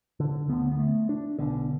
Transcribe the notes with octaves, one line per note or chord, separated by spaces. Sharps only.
D3
D2 D3 B3
B3
A3
D4
B1 B2 D3